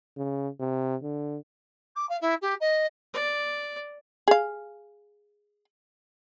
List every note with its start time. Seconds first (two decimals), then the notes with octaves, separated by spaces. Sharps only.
0.17 C#3
0.59 C3
1.02 D3
1.95 D6
2.09 F5
2.21 E4
2.41 G4
2.60 D#5
3.13 D5
4.28 G#4 F5